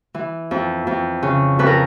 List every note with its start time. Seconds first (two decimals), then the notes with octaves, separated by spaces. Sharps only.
0.14 E3
0.51 F2
0.87 F2
1.23 C#3
1.59 F2 B4
1.67 A#4